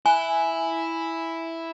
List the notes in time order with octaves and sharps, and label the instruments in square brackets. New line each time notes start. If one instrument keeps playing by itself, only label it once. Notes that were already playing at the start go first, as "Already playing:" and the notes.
[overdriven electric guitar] E4 [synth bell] G#5